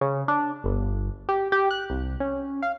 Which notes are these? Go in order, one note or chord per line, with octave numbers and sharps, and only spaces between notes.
C#3
D4
G1
G4
G4
F#6
C2
C#4
F5